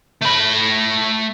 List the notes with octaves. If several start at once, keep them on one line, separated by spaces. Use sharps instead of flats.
A3 B5